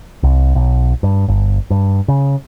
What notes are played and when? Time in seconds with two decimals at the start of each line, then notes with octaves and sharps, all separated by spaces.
0.23 C2
0.55 B1
1.03 G2
1.28 G1
1.70 G2
2.08 C#3